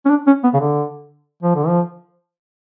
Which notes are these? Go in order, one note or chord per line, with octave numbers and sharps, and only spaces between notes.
C#4
D4
C#4
B3
C#3
D3
F3
D3
F3